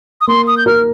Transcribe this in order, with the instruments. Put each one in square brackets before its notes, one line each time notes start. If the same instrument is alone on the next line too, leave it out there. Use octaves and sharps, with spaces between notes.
[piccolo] D#6
[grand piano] A#3 [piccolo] C6
[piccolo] D#6
G6
[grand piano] A#4 [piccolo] F6